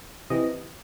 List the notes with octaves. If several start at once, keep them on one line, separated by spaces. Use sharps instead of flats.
C3 E3 D#5